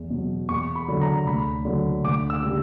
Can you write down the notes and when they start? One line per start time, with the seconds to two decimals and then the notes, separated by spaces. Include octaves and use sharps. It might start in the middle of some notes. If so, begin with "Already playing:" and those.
Already playing: E2
0.10 B2 F#3
0.49 E2 C#6
0.75 B5
0.88 D3 F#3
1.01 A#5
1.27 D2 B5
1.65 D3 F#3
2.04 D2 D6
2.30 E6
2.43 C#3 G3